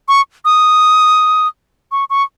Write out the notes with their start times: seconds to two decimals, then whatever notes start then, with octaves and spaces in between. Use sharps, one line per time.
0.08 C#6
0.45 D#6
1.92 C#6
2.10 C#6